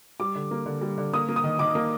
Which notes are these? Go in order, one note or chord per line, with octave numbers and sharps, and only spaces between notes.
G3 D6
D3
A#3
D3
G3
D3
A#3 D#6
A#3
D#6
D#3
D#3 D6
A#3